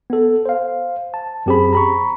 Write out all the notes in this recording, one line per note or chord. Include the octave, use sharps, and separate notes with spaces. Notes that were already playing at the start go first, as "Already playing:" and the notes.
B3 A4
C5 F5
A5
F#2 C4 G4 G#4 C5 B5
A#5 B5 C#6